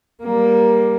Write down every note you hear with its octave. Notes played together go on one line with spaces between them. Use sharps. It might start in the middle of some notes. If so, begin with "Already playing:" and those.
G3 A#3